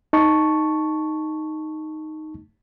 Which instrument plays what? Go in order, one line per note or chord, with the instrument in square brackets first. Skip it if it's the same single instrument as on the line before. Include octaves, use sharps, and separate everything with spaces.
[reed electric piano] D#4 A5 C#6